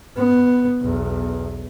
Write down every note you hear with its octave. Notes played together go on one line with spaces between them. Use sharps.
B3
B1 E2